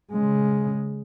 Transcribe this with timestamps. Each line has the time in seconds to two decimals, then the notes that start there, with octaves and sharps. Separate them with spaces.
0.11 C#3 G#3